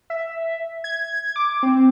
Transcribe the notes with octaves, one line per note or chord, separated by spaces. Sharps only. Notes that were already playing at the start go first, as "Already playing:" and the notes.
E5
G#6
D6
C4